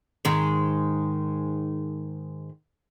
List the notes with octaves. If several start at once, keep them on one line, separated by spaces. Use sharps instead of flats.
G#2 D#3 G#3